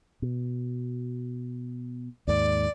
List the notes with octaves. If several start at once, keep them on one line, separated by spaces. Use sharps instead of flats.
B2
D#2 G#2 D5